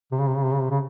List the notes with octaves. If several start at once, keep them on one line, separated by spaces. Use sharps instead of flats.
C3
C#3
C3
C#3
C3
C#3
C3
C#3